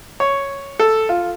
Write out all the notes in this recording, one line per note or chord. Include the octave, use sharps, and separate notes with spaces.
C#5
A4
F4